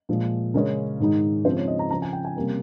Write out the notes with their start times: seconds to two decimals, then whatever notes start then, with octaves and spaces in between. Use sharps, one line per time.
0.09 A#2 F3 G#3
0.54 C#3 G#3 C#4 A#4
1.00 G#2 D#3 G#3 D#4
1.45 C#3 F3 G#3 C4 D#4 C5
1.57 C#5
1.68 D#5
1.79 A#5
1.90 C#3 F3 C4 A#5
2.02 G#5
2.13 G5
2.25 G#5
2.36 C3 G3 A#3 C#4